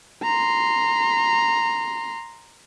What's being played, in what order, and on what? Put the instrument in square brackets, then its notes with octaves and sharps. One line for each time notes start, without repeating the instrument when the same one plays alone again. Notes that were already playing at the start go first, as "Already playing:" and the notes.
[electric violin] A#5 C6